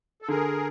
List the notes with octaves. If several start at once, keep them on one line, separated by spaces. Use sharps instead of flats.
A4
D3 G#4 A#4